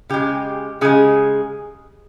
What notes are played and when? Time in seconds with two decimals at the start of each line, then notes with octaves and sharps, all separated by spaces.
0.10 C#3 G#3 G4
0.81 C#3 G#3 G#4